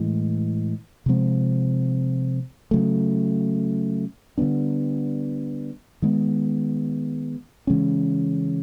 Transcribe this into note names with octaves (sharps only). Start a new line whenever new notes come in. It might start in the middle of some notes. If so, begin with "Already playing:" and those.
Already playing: A2 E3 G#3
C3 F3 G#3 C4
C#3 F#3 A3
D3 G3 B3 D4
D#3 G#3 B3
C#3 E3 G#3 C#4